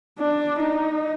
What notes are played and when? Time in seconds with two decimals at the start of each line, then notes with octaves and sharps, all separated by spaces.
0.19 D4
0.60 D#4